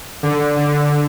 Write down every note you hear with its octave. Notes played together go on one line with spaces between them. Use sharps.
D3
D3